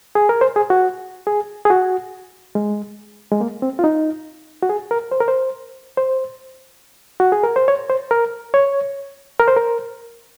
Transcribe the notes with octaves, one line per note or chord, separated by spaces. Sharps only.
G#4
A#4
C5
G#4
F#4
G#4
G#4
F#4
G#3
G#3
A#3
C4
F4
D#4
F#4
G#4
A#4
C5
A#4
C5
C5
F#4
G#4
A#4
C5
C#5
C5
A#4
C#5
A#4
C5
A#4